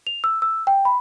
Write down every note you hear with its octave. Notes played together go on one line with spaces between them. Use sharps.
F7
E6
E6
G5
B5